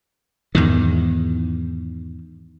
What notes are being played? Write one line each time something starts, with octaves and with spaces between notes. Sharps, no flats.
E2 G#2 D#3